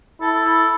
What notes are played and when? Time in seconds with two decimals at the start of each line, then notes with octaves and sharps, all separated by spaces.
0.21 E4 A4
0.45 A4